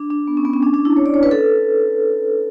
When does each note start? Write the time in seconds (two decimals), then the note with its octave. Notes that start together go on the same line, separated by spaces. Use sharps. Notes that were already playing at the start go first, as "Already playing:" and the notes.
Already playing: D4
0.10 D4
0.27 B3
0.37 C#4
0.45 B3
0.53 C#4
0.63 D4
0.74 D4
0.85 E4
0.97 C#5
1.06 D5
1.14 C#5
1.23 B4
1.31 A4